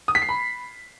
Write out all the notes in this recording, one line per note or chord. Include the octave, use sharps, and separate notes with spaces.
D#6
B6
C7
B5